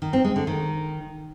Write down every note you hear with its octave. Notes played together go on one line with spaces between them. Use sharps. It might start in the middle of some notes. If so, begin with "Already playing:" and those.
D#3
C4
G#3
D3
D#3